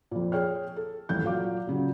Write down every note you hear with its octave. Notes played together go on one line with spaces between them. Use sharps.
F2 A#2
G#4 C#5 G5 F6
A4
D#1 A1 G6
A#2 F#3 F5 D6
A#2 C#3 F#3